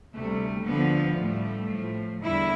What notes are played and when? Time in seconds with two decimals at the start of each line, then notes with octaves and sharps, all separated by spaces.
0.14 D2 C3 G3 A3
0.66 D2 D3 F3 B3
1.18 A2 G3 A3
1.71 A2 F3
2.23 E2 D3 G3 E4